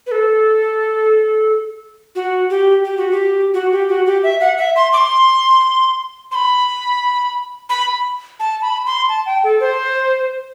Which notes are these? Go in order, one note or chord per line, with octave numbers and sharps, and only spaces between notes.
B4
A4
F#4
G4
G4
F#4
G4
F#4
G4
F#4
G4
E5
F#5
E5
C6
D6
C6
C6
B5
B5
A5
B5
C6
A5
G5
A4
C5